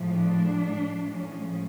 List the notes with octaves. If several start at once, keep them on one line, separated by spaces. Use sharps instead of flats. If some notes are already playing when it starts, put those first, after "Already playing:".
Already playing: A2 F3 G#3
D4
A2 F3 G#3
C#4